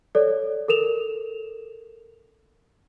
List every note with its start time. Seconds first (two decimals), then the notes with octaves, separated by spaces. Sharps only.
0.15 A4 C#5 D5
0.68 A4 A#4 E7 F7